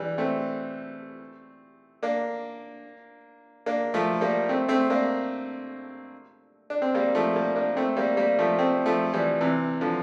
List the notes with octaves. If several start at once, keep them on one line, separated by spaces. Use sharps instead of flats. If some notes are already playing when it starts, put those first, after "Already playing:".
Already playing: E3 G3
A3 C4
A#3 D4
A#3 D4
F3 A3
G3 A#3
A3 C4
A3 C4
A#3 D4
D4
C4
G3 A#3
F3 A3
G3 A#3
A#3 D4
A3 C4
G3 A#3
G3 A#3
F3 A3
A3 C4
F3 A3
E3 G3
C3 E3
D3 F3